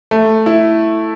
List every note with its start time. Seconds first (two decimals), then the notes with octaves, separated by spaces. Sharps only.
0.11 A3
0.46 E4